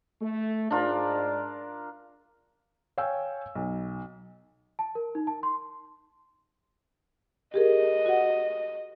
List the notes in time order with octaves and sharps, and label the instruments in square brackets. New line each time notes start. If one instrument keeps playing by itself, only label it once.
[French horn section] A3
[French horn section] G#2 D5 [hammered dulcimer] D4 F4 A#4
[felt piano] C#5 F5 G5 G#5 E6
B1
[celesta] A5
A#4
D#4
A5
C6
[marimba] G4 G#4 A#4 [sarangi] D#5
[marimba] F#4 F#5